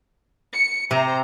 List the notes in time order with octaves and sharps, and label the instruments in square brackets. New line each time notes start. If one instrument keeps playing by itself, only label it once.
[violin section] C#7
[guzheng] C3 [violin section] C5 A#5